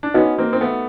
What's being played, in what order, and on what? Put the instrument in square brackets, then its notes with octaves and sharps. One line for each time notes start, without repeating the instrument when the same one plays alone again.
[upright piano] D4
[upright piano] B3 C#4 [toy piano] D#4 F#4 B4 D#5
[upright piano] A#3 C4
C4
A3 B3